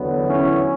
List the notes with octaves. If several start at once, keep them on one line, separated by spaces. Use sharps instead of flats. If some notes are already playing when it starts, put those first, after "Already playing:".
Already playing: E2 D3 F#3 B3
C#4 E4